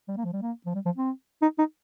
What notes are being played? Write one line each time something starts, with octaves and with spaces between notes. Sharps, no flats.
G3
A#3
F3
G3
A#3
F3
G3
F3
C4
D#4
D#4